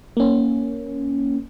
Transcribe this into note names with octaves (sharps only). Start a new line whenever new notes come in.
A#3 C#4